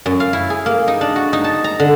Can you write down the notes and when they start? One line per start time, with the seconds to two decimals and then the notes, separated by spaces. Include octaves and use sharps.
0.06 F#2
0.20 F5
0.33 E4
0.50 G#4
0.66 A#3
0.88 D#4
1.01 D4
1.16 F#4
1.33 D#4
1.44 A5
1.64 A#5
1.80 D3